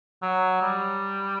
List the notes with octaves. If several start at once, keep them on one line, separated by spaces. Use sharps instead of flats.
F#3
G3